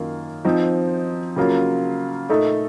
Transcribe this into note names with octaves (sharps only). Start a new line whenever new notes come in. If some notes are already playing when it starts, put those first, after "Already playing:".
Already playing: F#2 D#3 A#3 F4
F3 C4 D#4
C#3 F#3 A#3 F4
A#2 A3 D#4 A4